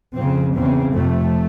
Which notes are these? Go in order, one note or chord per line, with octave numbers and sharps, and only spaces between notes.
F2 C#3 C4
E2 C#3 C4
F2 C3 A3